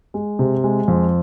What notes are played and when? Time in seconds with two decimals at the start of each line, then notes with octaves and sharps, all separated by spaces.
0.14 G#3
0.39 C3
0.64 G#3
0.88 F2